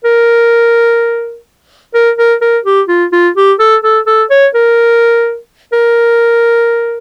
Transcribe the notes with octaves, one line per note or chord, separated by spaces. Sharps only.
A#4
A#4
A#4
A#4
G4
F4
F4
G4
A4
A4
A4
C#5
A#4
A#4